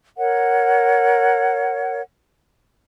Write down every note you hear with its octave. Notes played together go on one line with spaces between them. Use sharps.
A#4 C#5 F#5